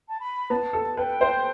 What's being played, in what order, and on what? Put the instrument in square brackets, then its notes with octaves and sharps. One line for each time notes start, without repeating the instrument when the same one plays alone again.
[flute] A5
B5
[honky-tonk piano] B3 [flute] A5
[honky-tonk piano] A4
[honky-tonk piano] B4 [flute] G5
[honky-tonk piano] C5